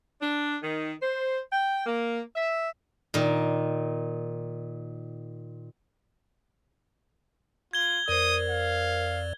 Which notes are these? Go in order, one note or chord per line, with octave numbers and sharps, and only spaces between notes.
D4
D#3
C5
G5
A#3
E5
A#2 D#3
F4 G#6 G7
F2 A#4 C5 D5 D#6
F5